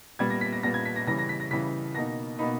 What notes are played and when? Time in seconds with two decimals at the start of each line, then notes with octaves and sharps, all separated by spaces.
0.19 A#2 G3 B3 G#6
0.30 A#6
0.41 B6
0.52 A#6
0.63 A#2 G3 B3 A#6
0.74 G#6
0.85 B6
0.96 A#6
1.07 C#3 E3 G3 A#6
1.18 A#6
1.29 B6
1.40 A#6
1.51 C#3 E3 G3 B6
1.95 B2 A#3 D#4 A#6
2.38 B2 A#3 D#4 B5